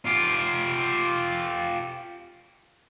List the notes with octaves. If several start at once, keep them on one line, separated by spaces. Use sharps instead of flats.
F4 G4